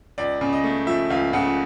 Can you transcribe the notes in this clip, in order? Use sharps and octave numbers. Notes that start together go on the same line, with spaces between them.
C#2 D5
C#3
D#5
A3
F3 E5
C#2 F5
C#3 F#5